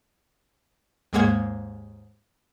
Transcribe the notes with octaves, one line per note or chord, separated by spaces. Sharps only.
D#2 G#2 G#3 A#3 F#5 G#6